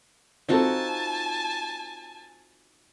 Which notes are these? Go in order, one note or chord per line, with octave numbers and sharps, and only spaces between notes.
C4 D#4 F4 F#4 A4 G#5 A5